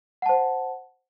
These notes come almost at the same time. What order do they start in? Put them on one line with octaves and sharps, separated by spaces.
F#5 A5 C5